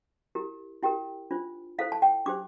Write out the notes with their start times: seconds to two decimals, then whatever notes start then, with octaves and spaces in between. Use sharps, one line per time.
0.35 E4 G4 A#4
0.83 E4 G4 A#4 G5
1.31 D4 F4 C5
1.78 E4 A4 C5 F5
1.92 A5
2.02 G5
2.26 D4 G4 C5 D6